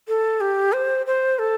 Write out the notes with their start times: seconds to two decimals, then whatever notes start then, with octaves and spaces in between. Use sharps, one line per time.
0.08 A4
0.41 G4
0.73 C5
1.07 C5
1.39 A4